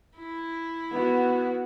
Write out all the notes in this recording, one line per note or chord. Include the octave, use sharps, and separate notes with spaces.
E4
B3 F#4